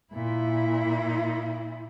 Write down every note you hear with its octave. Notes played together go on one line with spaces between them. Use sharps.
A#2 E4